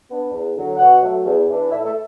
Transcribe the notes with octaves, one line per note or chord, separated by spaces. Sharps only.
B3 D4
E2
D3 F#3
B2 F#4 F#5
F#3 A3
E2
E3
D4
A2 E4 E5
A3 A4